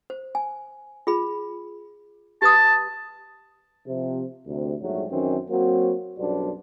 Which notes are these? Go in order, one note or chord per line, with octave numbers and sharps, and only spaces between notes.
C5
G#5
F4 G#4 B5
G4 B4 A5 D#6
C3 F3
D2 C3
A#1 G#2 F#3 G3 A3
F#2 D#3 E3 C4 C#4
F#3 A#3 C4 F#4
B1 F#2 G3 B3 D4 C5